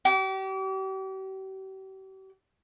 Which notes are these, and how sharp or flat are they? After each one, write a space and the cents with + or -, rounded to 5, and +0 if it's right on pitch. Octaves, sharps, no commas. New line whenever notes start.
G4 -40